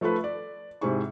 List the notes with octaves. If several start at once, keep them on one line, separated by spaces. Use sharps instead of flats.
F3 A3 F4 A4 B4
D5
G#2 C3 C4 E4 G#4 C#6